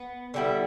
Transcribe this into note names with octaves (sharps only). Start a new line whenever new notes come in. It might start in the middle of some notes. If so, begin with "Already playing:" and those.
Already playing: B3
D3 G3 B3 E4